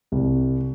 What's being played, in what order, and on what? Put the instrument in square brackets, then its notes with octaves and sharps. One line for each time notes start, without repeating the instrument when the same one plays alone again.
[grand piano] C2